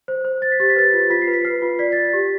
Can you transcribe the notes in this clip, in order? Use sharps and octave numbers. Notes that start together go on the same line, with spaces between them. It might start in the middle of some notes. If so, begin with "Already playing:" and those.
C5
C5
C5 A6
B6
G4 A6
B6
B4 A6
F4
F4 B6
C7
B4
B6
B4 C7
F4
D5 B6
D5 A6
B6
G4